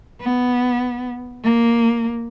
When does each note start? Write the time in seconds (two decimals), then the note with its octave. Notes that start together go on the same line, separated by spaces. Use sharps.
0.21 B3
1.44 A#3